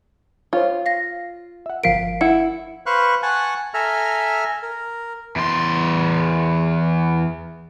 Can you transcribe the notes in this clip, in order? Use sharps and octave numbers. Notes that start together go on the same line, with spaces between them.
F4 C5 C#5 D6
F5 A#6
E5 F#5
G1 F3 A#4 F5 B6 D7
E4 F#5
B4 C5 F5 C#6 F#6
F#5 G#5 A5 C#6 F#6
A4 E5 G#5 A#5 F6
A#4
E2 C6